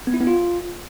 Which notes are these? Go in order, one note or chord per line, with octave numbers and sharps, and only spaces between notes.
B3
E4
B3
F4